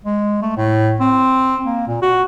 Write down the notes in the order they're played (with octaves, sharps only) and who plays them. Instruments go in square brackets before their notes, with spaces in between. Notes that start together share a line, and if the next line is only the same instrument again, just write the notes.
[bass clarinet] G#3
A3
A2
C4
A#3
A#2
F#4